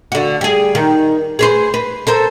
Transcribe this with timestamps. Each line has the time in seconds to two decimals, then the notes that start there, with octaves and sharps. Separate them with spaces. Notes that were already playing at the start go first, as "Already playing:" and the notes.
0.12 D3 F#4
0.41 G3 G#4
0.75 D#3
1.39 G#4 B4 C5
1.74 B4
2.07 A4 A#4 C5